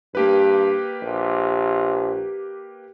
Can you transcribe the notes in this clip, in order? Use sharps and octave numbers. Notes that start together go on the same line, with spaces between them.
G2 A#3 G4 B4
A#1